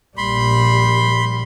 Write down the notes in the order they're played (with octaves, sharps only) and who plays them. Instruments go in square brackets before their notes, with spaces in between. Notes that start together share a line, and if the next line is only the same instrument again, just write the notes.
[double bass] A#1 G3 [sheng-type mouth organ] B5 C6